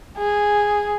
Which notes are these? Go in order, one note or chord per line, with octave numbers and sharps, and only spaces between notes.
G#4